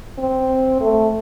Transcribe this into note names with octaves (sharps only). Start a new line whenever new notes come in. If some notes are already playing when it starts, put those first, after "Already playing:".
C4
A3